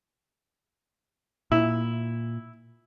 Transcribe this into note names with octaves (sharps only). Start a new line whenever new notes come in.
A#2 E4